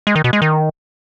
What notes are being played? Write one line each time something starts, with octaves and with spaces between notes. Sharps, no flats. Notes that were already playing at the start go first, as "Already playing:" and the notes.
G#3
D#3
B2
G#3
D#3